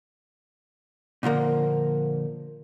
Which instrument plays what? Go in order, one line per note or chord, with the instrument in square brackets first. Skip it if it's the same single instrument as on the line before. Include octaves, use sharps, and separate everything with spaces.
[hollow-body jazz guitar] A#2 D3 F3 A#3